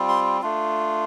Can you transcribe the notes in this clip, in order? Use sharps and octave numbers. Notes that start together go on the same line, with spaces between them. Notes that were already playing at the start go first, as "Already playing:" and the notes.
Already playing: G3 C4 F4
C6
A3 D4 F4